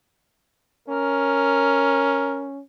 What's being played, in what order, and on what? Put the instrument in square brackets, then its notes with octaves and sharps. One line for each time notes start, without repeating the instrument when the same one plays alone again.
[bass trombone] C#4 [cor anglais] A#4